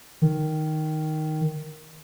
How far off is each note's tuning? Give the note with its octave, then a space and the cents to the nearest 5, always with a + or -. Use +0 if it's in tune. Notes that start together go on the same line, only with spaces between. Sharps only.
D#3 +0